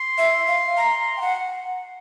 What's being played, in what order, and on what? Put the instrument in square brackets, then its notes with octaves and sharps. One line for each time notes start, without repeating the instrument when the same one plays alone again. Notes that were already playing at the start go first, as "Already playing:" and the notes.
Already playing: [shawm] C6
[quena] E5
F5
A#5
G5
F#5